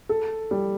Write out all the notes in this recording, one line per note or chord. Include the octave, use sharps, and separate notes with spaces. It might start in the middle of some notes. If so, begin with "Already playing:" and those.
A4
G3